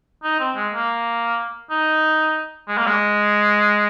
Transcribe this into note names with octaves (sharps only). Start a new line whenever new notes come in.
D#4
C4
G#3
A#3
D#4
G#3
A#3
G#3